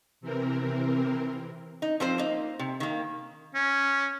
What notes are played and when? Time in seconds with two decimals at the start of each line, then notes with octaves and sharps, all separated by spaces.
0.21 C3 E3 C4 A#4
1.82 D#4
2.00 F3 C4 C5
2.18 A#3 D#4
2.59 C3
2.80 D#3 A#3
3.55 C#4